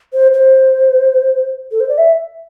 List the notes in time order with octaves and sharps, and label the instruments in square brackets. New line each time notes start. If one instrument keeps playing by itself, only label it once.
[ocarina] C5
C5
A4
C5
D5
E5